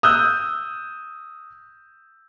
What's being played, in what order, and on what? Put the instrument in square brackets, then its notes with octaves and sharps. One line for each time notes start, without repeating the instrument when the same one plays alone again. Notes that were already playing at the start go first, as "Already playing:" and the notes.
[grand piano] D#6 E6 F#6 G6